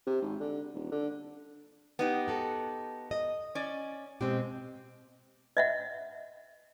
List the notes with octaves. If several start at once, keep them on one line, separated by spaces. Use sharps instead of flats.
C3
G#1
D3
D#1
D3
B3 D#4 G4
F#4 A4
D#5
C#4 D5
B2 G#3 C4 G4
D#5 E5 F#5